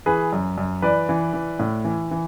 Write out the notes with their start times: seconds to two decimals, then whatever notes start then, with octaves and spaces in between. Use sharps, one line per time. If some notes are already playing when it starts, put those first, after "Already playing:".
0.06 E3 G#4 B4
0.33 F#2
0.58 F#2
0.82 E3 B4 D5
1.09 E3
1.33 E3
1.59 A2
1.84 E3
2.11 E3